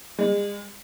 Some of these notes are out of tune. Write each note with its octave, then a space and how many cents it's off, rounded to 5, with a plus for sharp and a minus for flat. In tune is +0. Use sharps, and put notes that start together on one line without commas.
G#3 -40